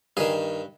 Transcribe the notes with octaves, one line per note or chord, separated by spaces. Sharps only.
G2 D#3 G#4